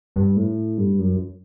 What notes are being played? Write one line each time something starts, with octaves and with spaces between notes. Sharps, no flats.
G2
A2
G2
F#2